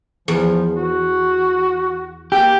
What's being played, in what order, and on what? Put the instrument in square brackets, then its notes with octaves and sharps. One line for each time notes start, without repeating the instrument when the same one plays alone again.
[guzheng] E2 [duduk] F3
[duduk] F#4
[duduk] A#3 [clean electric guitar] G4